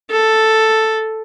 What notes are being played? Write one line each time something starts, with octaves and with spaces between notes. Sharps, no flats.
A4